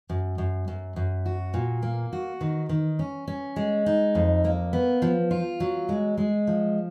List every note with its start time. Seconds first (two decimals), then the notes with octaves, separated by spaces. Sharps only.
0.10 F#2
0.38 F#2
0.68 F#2
0.96 F#2
1.26 F#4
1.54 A#2
1.83 A#3
2.13 F#4
2.41 D#3
2.69 D#3
2.99 C#4
3.28 C#4
3.56 G#3
3.86 D#4
4.15 F2
4.45 A#3
4.73 B3
5.02 F3
5.31 F4
5.60 F#3
5.89 G#3
6.17 G#3
6.47 F3